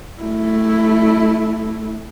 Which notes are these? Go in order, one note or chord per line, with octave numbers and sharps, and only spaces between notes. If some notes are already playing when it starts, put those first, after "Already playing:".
A3 E4